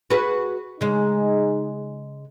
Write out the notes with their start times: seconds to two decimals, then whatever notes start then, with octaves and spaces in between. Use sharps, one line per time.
0.10 F#4 G#4 B4
0.81 C#3 G#3 D#4 G#4